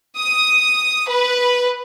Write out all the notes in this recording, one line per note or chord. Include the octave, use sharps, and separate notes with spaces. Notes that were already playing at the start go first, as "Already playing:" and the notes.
D#6
B4